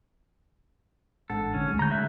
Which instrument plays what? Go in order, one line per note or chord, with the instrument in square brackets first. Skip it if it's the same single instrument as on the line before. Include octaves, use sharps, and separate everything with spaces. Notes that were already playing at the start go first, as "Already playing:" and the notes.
[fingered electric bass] A1 [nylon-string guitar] G#2 D4 F#5 [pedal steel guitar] A4
[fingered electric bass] D3 D#3 [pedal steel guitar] C#4
[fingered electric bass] D1 C#2 F#3 [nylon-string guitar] G#3 A3
[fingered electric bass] D3 D#3 [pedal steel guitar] A#5 G6
[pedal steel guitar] F#3 E5 F#6